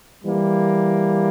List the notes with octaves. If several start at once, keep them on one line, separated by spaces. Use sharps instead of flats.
E3 G3 A#3